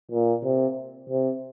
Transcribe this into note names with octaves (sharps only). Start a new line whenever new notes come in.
A#2
C3
C3